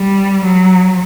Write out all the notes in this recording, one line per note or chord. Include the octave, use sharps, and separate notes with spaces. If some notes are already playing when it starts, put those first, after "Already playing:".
Already playing: G3
F#3